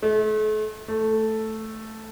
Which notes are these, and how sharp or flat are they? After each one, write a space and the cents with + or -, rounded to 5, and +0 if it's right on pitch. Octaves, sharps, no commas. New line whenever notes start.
A3 -40
A3 +0